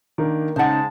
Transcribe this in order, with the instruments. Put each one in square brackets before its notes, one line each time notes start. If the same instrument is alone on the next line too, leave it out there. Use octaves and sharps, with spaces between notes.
[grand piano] D#3 A#3 D4
[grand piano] C#3 D#4 [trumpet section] G#3 A5 [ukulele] C5 F#5